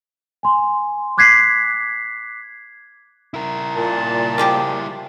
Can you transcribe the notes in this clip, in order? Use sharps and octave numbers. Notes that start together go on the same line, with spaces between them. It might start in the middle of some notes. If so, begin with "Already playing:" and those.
G#5 C6
D6 F#6 G#6 B6 C7
E4 A#4
A#2 A5
F3 G#3 G4